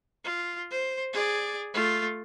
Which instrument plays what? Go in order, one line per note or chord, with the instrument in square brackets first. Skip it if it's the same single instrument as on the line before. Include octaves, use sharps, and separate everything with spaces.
[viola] F4
C5
G#4 D5
A3 F4